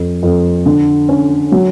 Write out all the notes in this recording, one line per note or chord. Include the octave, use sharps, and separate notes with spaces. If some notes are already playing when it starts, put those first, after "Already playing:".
Already playing: F2
F2
D3
C#4
F#3